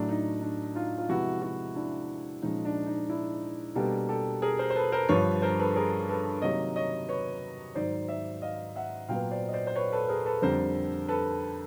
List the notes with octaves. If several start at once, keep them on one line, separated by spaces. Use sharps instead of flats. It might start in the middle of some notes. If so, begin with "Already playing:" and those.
Already playing: A2 F#3 A3 D4
D#4
D4
D#4 F4
F4
C3 F3 G#3 B3 E4 F#4
E4 F#4
D4 E4
A#2 F3 G#3 C#4 D#4
D4
D#4
D4 E4
B2 G3 A#3 D4 G4 A4
G4 A4
G#4 A#4
A#4 C5
C5
A4 B4
A#4 C5
G2 D3 F3 B4 C#5
A#4 C5
A4 B4
G#4 A#4
A4 B4
C3 D#3 F#3 A#3 C#5 D#5
C#5 D#5
B4 C#5
G#2 D#3 F#3 C5 D5
D5 E5
D#5 F5
E5 F#5
A#2 F#3 B3 F5 G5
C5 D5
D#5
C5 D5
C5
B4 C#5
A4 B4
G#4 A#4
A4 B4
F2 D3 G3 A#4 C5
A4 B4